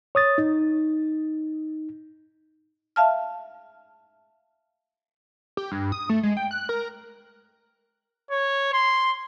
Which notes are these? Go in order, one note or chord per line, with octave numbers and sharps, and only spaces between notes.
C#5 D#6 A6
D#4
E5 F5 A5 F6
G4
G2
D#6
A3
G#3
G5
F#6
A#4
C#5
C6